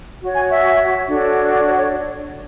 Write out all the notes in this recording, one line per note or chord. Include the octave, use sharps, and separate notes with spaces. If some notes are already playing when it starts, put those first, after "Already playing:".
F#4 C#5
G#5
E5
D4 F#4 A4 C#5
D5
C#5
C#5